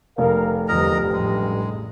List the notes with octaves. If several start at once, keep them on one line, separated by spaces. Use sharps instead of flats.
F1 A#4 F5
E2 G2 D3 F3 A#4 D#5 A#5
A1 G#3